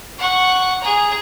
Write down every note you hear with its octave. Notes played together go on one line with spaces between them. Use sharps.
F#5 C#6
G#4 A#5